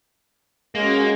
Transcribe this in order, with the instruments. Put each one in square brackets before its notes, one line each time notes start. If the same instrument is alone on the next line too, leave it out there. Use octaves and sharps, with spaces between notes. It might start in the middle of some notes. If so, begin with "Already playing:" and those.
[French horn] G#3 [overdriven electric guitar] A#3 [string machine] C#4 F#4 C#5